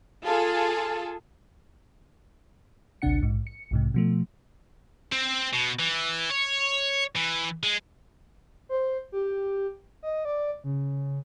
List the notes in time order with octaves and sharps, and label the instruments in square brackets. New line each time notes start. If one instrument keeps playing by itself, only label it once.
[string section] F4 G#4 A4
[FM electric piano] A1 D2 C3 D4 F#5 C#7
A#1 G#2
C#7
B1 G#2 C3
B2 F3 A3
[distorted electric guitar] C4
B2
E3
C#5
E3
G#3
[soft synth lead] C5
G4
D#5
D5
C#3